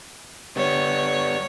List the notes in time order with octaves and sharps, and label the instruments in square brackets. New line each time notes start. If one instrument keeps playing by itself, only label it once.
[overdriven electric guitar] G3 B3 [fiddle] C#5